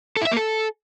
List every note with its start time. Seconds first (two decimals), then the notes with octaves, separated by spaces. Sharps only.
0.17 A4
0.22 E4
0.27 E5
0.32 A#3
0.37 A4